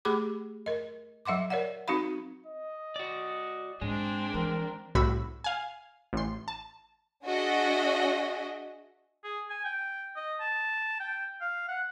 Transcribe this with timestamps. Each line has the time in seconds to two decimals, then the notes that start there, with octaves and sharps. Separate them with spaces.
0.05 A3 G4 G#4 B5 D6
0.66 A#4 D#5
1.25 F#3 E5 F#5 C6 D6
1.50 A#4 C#5 D5 F5 F#5
1.88 C4 D#4 F#4 F5 B5
2.47 D#5
2.96 F#4 D5
3.81 G#2 G#3 C4 D4
4.34 E3 A#4
4.95 C2 A2 F#4 B5 E6
5.44 F5 G#5
6.13 A1 C6
6.48 A5
7.23 D4 F#4 G#4 D#5 E5
9.24 G#4
9.50 G#5
9.65 G5
10.16 D#5
10.40 A5
11.00 G5
11.41 F5
11.69 F#5